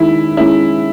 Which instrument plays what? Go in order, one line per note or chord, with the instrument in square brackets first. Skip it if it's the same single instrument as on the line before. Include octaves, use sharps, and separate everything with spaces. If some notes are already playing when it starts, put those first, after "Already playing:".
Already playing: [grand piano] D#3 G#3 C#4 [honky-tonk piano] E4
[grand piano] G#3 C#4 [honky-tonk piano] E4